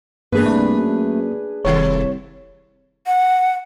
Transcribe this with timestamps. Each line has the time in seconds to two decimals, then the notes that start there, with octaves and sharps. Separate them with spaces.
0.32 E1 G2 A#3 D4 G#4 B4
0.46 C2 A3
0.77 F#2
1.65 F1 C2 D#3 A3 C#5
3.07 F#5